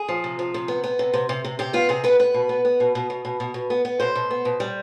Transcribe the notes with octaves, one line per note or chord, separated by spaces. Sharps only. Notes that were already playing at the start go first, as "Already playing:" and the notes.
Already playing: G#4
F3
C3
F3
C3
B3
B3
C3
C3
C3
C3
C3 G4
B3 F4
C3 G#4
B3 B4
B3 B4
B2
B3
B3
B2
B2
B2
B2
B2
B2
B3
B3
B2 C5
B2
B3
B2
G3